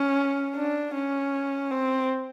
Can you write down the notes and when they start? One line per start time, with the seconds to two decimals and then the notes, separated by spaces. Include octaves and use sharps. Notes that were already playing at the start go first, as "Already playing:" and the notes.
Already playing: C#4
0.56 D4
0.94 C#4
1.71 C4